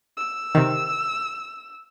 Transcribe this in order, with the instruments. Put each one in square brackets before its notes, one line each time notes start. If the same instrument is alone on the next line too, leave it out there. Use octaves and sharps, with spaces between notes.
[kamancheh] E6
[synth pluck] C3 D#3